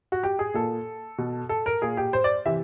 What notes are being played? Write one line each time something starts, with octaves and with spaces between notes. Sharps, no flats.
F#4
G4
G#4
A#2 A4
B2
A4
A#4
A#2 G#4
G4
C5
D5
C3 E3 E5